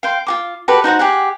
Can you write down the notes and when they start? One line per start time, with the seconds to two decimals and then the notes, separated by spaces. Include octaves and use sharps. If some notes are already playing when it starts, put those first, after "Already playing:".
0.03 F5 G5 C6
0.27 F4 F#4 D6
0.68 F#4 G4 A4 B4
0.84 D#4 F#4 C5 F#5
0.99 G4 G#4 F#5